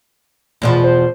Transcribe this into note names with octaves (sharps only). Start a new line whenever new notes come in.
E2 B2 F3
C5